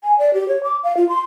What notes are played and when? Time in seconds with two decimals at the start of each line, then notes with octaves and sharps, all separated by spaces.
0.04 G#5
0.19 D5
0.34 G4
0.48 C#5
0.63 D6
0.84 F5
0.97 F4
1.09 C6